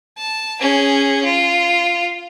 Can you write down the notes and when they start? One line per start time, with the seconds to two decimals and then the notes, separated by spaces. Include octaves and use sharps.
0.18 A5
0.61 C#4 G#4
1.25 F4